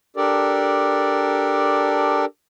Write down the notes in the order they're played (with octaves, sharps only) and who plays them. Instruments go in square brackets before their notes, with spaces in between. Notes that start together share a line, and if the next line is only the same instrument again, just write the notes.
[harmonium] D4 G4 A4 A#4 D5